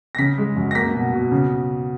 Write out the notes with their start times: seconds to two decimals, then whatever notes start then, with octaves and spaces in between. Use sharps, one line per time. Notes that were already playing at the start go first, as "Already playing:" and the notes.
0.15 A#6
0.18 C#3 B6
0.38 G#3
0.56 F#2
0.71 A#6
0.75 A#3 B6
0.94 B2
1.13 B2
1.32 C#3